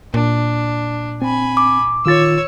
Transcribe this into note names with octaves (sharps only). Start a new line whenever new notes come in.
A#2 D4
C4 G#5 B5
D6
D#3 F4 C#5 E6 A6